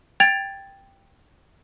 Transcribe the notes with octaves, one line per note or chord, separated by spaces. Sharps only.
G5 G#6 A6 F7